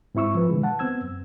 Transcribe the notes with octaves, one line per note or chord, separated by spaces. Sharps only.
G#2 C4 E4 C#6 E6
F3 B4
B2 D3 E3 G#3
F#5 A5
B3 C4 E6 G#6
F#2